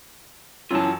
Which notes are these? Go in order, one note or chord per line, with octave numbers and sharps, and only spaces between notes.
F#2 E3 F#3 F4 A5